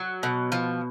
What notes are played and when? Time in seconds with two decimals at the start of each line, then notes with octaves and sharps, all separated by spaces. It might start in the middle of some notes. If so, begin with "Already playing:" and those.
Already playing: F#3
0.23 B2
0.52 F3